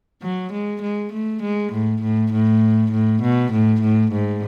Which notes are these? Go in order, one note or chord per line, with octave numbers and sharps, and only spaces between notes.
F#3
G#3
G#3
A3
G#3
A2
A2
A2
A2
B2
A2
A2
G#2